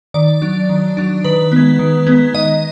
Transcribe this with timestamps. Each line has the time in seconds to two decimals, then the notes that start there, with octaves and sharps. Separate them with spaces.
0.14 D#3 D5
0.42 F#3 D4
0.69 D#3
0.97 F#3 D4
1.24 D#3 B4
1.52 G#3 B3
1.79 D#3
2.07 G#3 B3
2.34 D#3 D#5